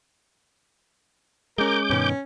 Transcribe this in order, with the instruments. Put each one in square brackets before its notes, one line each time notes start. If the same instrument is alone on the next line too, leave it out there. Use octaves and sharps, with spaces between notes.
[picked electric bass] G#3 C#4 [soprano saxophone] A#4 [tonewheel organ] D6 G6
[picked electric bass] G2 B2 D#3 [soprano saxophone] C#4